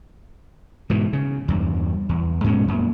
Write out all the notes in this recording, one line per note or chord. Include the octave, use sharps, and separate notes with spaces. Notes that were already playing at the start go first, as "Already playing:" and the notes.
G#2 B2 E3
C#3
E2 G2
E2
G#2 B2 G#3 C#4
F#2 A#2